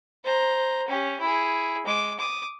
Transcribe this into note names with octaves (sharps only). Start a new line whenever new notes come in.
C5 A#5
C#4 G4
E4 G#4
G#3 D6
D6 D#6